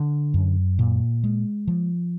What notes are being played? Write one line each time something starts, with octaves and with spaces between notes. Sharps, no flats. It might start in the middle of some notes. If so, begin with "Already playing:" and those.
Already playing: D3
F#2
A#2
G#3
F3